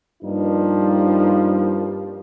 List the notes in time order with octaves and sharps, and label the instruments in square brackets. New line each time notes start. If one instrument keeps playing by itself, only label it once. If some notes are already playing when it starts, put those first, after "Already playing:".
[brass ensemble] G2 F3 G3 A#3 D#4